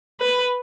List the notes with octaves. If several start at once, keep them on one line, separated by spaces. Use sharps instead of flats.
B4